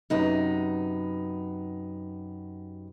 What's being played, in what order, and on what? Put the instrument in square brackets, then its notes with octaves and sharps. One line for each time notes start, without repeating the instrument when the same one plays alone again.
[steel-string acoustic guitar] F#2 C3 D#4 B4